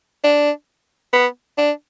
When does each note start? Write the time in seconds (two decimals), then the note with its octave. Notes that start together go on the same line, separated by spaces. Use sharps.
0.24 D4
1.13 B3
1.58 D4